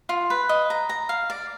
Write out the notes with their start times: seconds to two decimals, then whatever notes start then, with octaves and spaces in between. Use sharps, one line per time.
0.09 F4
0.30 B4
0.49 D#5
0.70 A#5
0.89 A#5
1.09 F5
1.30 D5